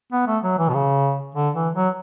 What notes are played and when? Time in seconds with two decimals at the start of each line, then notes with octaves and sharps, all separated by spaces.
0.12 B3
0.28 A3
0.44 F#3
0.58 E3
0.69 B2
0.74 C#3
1.35 D3
1.55 E3
1.75 F#3